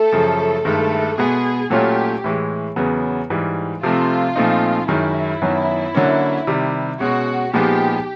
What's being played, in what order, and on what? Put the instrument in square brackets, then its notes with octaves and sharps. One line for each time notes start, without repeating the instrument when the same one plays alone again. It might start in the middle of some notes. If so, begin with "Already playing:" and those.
Already playing: [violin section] A3 A4
[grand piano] F#2 C#3 F3
[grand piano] G2 D#3 G#3 [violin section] A3 A4
[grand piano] B2 G#3 B3 [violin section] G#4
[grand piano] A#2 F#3 A3 C#4 F4 [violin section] G4
[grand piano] A2 E3 G#3
E2 C#3 F#3 B3
G#2 E3 G3
[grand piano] C3 F3 A3 C4 [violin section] F4
[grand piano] A#2 F3 A3 C4 D#4
[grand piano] F#2 D#3 G#3 [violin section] E4
[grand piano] F#2 D#3 F#3 B3
D3 F#3 A#3 C#4
C3 D#3 G3
[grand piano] B2 G#3 C#4 [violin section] F#4
[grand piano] A#2 F3 G#3 B3 D#4 [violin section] G4